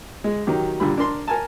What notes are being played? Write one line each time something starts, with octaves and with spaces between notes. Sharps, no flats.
G#3
D#3 F#3 G4
A#2 D3 G3 B5
D4 A#4 C6
A#4 G#5 A5